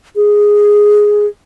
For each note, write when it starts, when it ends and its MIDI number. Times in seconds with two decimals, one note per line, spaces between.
0.16 1.26 68